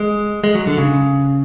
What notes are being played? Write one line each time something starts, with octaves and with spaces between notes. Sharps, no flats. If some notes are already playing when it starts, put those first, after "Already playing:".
Already playing: G#3
G#3
F#3
D3
C#3